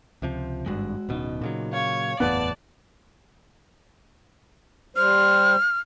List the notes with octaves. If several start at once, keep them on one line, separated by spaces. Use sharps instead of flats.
C#2 C3 F3
G#1 G2 G#3 F#4
D1 B2 B3 C#4 D#4
A#2 C#3 F#3
C#5 F5
F#1 E2 A2 B3 D5 A5
G3 C5 F6